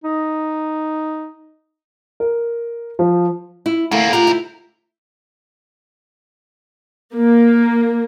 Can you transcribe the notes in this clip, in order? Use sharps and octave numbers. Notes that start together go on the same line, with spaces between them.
D#4
A#4
F3
E4
D2 A3 A#3 E4
C#2 F4 G4 A#4 F#5
E4 C5
A#3